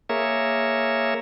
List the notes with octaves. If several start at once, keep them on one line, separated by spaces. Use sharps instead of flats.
A#3 G#4 A#4 C#5 E5